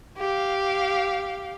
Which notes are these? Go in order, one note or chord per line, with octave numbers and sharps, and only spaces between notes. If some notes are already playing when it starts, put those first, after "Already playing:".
G4 F5